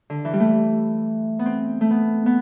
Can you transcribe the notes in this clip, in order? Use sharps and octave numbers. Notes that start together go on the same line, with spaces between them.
D3
E3
G3
A3
B3
C4
A3
B3
B3